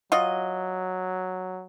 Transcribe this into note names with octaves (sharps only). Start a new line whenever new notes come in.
F#3 F4 F#4 D#5